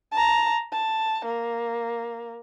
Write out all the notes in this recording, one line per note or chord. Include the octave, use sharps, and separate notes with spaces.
A5 A#5
A5
A#3